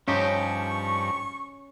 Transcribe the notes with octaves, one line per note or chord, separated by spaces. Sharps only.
G2 F3 C#4 D#4 G4 C#6